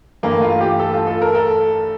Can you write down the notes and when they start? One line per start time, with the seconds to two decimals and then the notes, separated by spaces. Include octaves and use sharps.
0.23 G2 E3 A3 A#3
0.42 F4
0.61 G4
0.79 A4
0.93 F4
1.07 A4
1.22 A#4
1.35 A4